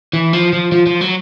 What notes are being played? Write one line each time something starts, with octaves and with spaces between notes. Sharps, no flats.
E3
F3
F3
F3
F3
F#3